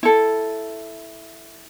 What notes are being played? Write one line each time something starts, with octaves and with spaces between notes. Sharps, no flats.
E4 A4